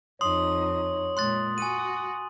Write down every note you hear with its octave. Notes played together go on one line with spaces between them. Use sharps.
F2 D#4 C#5 C6 D#6
A#2 G#3 C6 F#6 A6
F#4 G#5 D#7